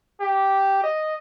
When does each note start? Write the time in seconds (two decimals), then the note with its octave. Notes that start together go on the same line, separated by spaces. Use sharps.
0.20 G4
0.83 D#5